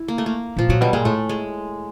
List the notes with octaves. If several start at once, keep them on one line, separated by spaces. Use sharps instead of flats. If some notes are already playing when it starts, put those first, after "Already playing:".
Already playing: E4
A#3
A3
A#3
A#2 F3
A#2 F#3
B2 G3
A#2 G#3
A2 A3
G#3